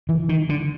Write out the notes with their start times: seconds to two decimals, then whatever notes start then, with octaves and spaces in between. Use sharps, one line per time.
0.09 E3
0.29 D#3
0.49 D3